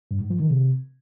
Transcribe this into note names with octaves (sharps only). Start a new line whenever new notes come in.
G2
G#2
F3
D#3
C3